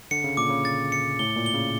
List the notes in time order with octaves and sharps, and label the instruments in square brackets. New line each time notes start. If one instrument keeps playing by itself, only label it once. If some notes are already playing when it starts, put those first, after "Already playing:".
[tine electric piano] D3 [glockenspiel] C#7
[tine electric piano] C#3
[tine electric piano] A#2 [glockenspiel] D6
[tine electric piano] C#3
[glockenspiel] A6
C#7
[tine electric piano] A2 [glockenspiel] G7
[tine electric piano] A#2
[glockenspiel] G7
[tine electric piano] C#3